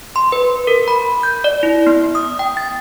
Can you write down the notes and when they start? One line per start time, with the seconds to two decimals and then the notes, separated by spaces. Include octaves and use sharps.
0.16 C6
0.32 B4
0.67 A#4
0.88 B5
1.23 G6
1.44 D5
1.63 E4
1.87 B3
2.15 D#6
2.39 G5
2.57 A6